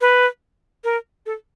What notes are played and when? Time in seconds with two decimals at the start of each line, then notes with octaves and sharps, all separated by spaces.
0.01 B4
0.84 A#4
1.26 A4